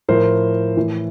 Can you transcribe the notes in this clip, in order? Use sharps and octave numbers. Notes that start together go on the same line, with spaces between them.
A2 F3 A#4 C5
A2 E3